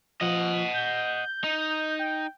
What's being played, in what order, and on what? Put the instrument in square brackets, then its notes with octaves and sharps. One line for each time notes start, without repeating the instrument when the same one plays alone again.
[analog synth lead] F3 [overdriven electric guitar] D#5 F#5
[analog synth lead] G6
[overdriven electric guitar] D#4
[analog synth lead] G5